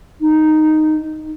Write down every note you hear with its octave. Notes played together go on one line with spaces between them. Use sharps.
D#4